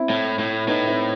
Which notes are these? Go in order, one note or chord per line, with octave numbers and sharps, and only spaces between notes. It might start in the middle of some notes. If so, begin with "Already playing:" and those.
Already playing: C4 E4
A2
A2
A2 B3 D#4
C4 E4